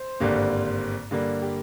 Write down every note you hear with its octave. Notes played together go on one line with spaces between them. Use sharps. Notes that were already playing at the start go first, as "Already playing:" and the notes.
Already playing: C5
G#1 G2 D3 G3 A#3
G2 D3 G3 A#3
G4